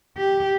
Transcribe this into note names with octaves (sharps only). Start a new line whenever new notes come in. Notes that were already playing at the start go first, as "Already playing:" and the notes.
G4